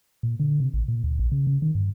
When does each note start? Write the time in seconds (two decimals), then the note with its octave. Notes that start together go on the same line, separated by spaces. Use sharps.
0.23 A#2
0.40 D3
0.60 C3
0.73 A1
0.88 A#2
1.04 D2
1.19 A#1
1.32 C#3
1.47 C#3
1.62 D#3
1.75 G2